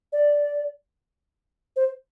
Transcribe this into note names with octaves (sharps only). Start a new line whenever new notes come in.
D5
C5